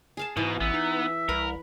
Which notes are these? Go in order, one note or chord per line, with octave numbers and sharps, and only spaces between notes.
G#4 F5 A5
G#2 B2 E3
A1 B3 E5
D#4
C2 A#4 B4